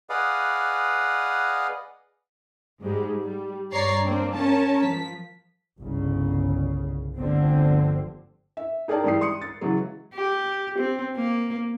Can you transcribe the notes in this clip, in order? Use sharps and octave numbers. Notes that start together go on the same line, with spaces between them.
G#4 B4 D5 D#5 F5 F#5
G#2 G3 G#3
G3
G2 C#5 D5 A#5 A6 C7
A#3 C4 D4
C#4 A#4 A5
F3 B6
G1 C2 C#3
G1 D2 D3 F3 C4
E5
D#4 G#4 A#4 D5 G5 A5
G#2 E3 G3 G5 D#6 C7
C6 D#6 C#7
A6
C#3 E3 F#3 G#3
G4
C4
A#3